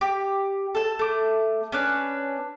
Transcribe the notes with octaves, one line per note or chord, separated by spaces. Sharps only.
G4
A4 A5
A3 D6
C#4 D4 B4